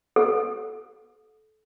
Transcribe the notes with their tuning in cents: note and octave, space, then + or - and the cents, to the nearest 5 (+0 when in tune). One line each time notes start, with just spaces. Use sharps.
A4 -25